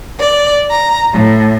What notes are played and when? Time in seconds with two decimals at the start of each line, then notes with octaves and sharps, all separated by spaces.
0.20 D5
0.71 A#5
1.13 A2